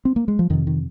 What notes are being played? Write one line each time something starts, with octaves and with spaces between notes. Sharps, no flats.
C4
A#3
G#3
F3
F2 C3 D#3
D#3